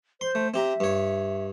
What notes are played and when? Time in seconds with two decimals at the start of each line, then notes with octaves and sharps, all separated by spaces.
0.21 C5 C6
0.35 A3
0.54 C4 G4 E5 A#5
0.80 G2 C#5